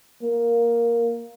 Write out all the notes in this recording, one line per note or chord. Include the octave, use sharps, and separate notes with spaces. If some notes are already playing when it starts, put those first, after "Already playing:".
A#3